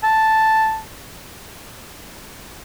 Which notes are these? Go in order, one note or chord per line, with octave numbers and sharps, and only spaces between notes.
A5